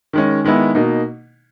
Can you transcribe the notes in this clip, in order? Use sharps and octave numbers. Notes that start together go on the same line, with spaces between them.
D#3 G#3 C#4
D#3 G#3 B3 E4
B2 A#3 D#4